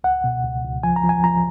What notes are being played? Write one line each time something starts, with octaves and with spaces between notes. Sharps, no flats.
C#2 F#5
B2
C#2
C#2
F3 G#5
A#5
F3
G#5
F3 A#5